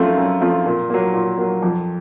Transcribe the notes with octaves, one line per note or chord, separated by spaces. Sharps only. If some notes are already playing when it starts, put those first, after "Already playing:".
Already playing: F#2 F3 A3 C4 F4
F#2
F3 A3 C4 F4
A#2
F#3 A#3
A#2
F#3 A#3
F2